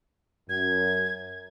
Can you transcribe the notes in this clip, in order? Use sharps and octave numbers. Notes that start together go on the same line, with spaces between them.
F#2 G#6